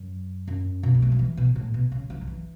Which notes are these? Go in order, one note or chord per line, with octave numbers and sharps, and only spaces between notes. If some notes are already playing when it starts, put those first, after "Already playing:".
Already playing: F#2
F#2
B2
B3
A3
F#3
E3
B2
A2
B2
C#3
E3
F#3
E3